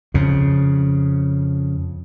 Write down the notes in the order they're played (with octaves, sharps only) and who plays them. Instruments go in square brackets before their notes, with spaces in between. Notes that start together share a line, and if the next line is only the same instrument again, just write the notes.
[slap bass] F2 C#3